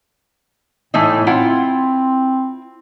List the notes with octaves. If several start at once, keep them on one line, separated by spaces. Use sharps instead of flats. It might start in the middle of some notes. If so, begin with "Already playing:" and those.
A2 E3 A3 D#4
C4 E4 F4 F#5